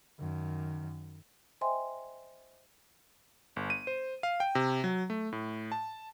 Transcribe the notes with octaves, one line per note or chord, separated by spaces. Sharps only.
F#2 D#3
C5 D#5 E5 G5 G#5 C6
G1
D#7
C5
F5
G5
C3
F#3
A3
A2
A5